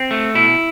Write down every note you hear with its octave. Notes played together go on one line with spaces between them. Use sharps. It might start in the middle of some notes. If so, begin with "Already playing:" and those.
Already playing: C4
A3
B2 E4